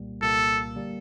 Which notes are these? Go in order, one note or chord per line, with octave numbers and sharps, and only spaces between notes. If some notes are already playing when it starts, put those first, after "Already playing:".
Already playing: C2 A#2 G3 A#3
C2 A#2 G3 A#3 A4
D3 G3 A#3